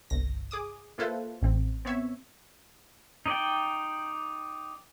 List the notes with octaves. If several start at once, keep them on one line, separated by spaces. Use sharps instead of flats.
G1 C2 A#6
G#4 D6 D#6
A#3 E4 F4 A4 B4 C5
A1 C4
B3 C4 C#5 E5
D#4 D5 G5